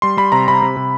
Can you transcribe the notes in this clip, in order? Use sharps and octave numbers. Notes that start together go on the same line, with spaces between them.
G3 C6
G3 B5
C3 A#5
C3 B5
C3
C3